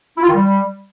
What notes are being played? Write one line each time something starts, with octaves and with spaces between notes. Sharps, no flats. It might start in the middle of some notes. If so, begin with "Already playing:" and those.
E4
F4
D#3
G3